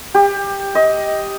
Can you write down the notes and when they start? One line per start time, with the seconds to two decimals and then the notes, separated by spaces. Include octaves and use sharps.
0.14 G4
0.75 D#5